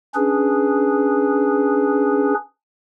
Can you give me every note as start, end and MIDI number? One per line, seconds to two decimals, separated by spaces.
0.15 2.34 61
0.15 2.34 62
0.15 2.34 68
0.15 2.34 71